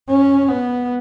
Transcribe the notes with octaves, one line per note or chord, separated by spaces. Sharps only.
C#4
B3